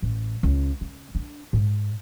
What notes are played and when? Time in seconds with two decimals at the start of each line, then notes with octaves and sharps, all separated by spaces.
0.02 A1
0.43 C#2
0.81 C#3
1.15 D4
1.53 G#2